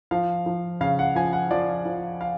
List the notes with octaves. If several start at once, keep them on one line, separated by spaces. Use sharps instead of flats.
F3 F5
F3
C#3 F5
F#5
F3 G#5
F#5
F3 D5
F3
F5